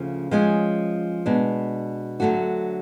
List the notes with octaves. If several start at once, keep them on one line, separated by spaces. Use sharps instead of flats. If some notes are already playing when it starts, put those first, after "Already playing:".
Already playing: D2 C#3 F3 A3
F3 G#3 C#4 G#4
B2 G#3 D4
D3 F#3 A3 D4 F#4